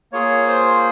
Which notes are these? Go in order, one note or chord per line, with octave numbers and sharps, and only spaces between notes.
A#3 F4 G#4 C#5
C5